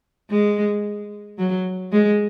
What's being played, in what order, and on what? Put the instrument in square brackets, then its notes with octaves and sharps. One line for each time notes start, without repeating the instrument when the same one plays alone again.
[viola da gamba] G#3
F#3
G#3